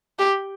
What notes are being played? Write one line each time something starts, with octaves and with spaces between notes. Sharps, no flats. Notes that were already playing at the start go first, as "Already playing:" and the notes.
G4